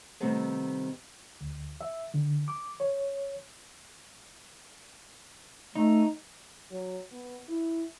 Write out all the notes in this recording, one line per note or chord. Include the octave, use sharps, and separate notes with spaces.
C3 D#3 G3 A3 B3 C4
D2
E5
D3
D6
C#5
A3 D#4
F#3
B3
E4